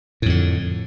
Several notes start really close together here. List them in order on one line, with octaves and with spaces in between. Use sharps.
A2 F2 D3